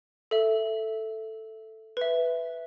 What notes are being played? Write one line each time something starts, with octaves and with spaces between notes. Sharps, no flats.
A4 E5
B4 E5